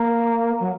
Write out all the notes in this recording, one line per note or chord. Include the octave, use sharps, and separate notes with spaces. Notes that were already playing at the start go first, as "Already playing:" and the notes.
Already playing: A#3
F#3